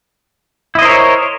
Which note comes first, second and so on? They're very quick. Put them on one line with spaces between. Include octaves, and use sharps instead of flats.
E4 D#5 C5 A#4 C#5